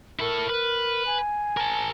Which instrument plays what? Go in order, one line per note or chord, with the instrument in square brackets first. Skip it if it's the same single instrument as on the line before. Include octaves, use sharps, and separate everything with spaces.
[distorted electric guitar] E4 A4 [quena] A#4
[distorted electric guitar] B4
[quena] G#5
[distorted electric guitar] A#4 A5